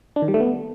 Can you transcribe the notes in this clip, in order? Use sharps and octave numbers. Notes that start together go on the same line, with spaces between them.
D4
D#3
G3
A3
B3